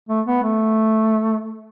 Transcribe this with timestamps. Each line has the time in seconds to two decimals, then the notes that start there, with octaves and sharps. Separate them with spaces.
0.09 A3
0.27 B3
0.43 A3